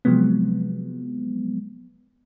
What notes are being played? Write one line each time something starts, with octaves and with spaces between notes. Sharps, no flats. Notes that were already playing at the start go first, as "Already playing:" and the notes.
C3 F3 F#3 G#3 B3